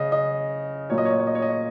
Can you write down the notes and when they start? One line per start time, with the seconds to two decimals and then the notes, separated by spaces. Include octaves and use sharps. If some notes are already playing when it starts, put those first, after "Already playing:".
Already playing: C#3 D#5
0.12 D#5
0.90 A#2 F#3 C#5
0.98 D#5
1.05 C#5
1.12 D#5
1.20 C#5
1.27 D#5
1.35 C#5
1.42 D#5
1.50 C#5